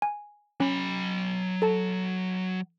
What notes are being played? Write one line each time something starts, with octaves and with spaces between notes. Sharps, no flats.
G#5
F#3 C#4 B5
A4 A5